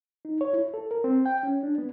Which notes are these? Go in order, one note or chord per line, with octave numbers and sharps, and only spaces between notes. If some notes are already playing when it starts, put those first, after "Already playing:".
D#4
C#5
E4
A4
A#4
C4
G5
C#4
D4
B3